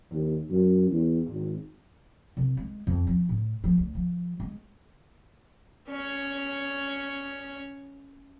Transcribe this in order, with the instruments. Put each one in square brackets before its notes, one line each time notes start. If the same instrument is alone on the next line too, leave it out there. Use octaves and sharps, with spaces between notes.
[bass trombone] D#2
F#2
E2
G#1
[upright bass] C2
G#3
F2
F3
A2
F3
D2
F3
G#3
[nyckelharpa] C#4 C#5